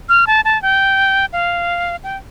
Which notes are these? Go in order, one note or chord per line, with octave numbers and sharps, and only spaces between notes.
F6
A5
A5
G5
F5
G5